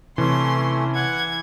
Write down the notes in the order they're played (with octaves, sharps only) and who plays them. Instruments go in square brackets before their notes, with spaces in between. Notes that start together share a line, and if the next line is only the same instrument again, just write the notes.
[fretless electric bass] C3 [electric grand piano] E3 [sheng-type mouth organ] A3 C#4 [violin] C6
[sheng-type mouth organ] F#5 [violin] G#6